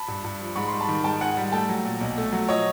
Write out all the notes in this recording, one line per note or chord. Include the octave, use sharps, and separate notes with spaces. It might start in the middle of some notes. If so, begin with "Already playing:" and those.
Already playing: A5 B5
G2
G2
F3
G#2 B5 C#6
G3 C6
A5 B5
D#3
G#2 G5 A5
G#2 F#5 G#5
G3
A3 G5 A5
F#3
A#2
B1
A3
F#3
F3 C#5 D#5